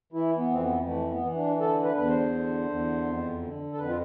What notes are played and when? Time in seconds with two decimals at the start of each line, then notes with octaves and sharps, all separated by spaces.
0.12 E3 E4
0.38 B3
0.50 F2 C4
0.61 B3
0.86 E3 A3
1.11 B3
1.23 E3
1.35 D4
1.60 D3 A4
1.84 B4
1.96 E2 B4
2.08 C5
2.33 D3
2.69 E2
3.06 F2
3.42 D3
3.73 A4
3.78 F2 B4
3.89 F4